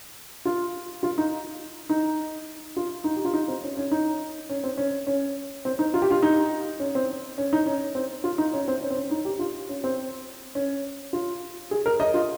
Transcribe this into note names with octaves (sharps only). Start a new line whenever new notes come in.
F4
F4
D#4
D#4
F4
D#4
G4
F4
D#4
C4
C#4
C#4
D#4
C#4
C4
C#4
C#4
C4
D#4
F4
G4
F4
D#4
C#4
C4
C#4
D#4
C#4
C4
F4
D#4
C#4
C4
C#4
C4
C#4
D#4
G4
F4
C#4
C4
C#4
F4
G#4
A#4
D#5
F4